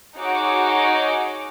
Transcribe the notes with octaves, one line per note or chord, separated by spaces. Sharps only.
D#4 F#4 G#4 C#5 F#5 D6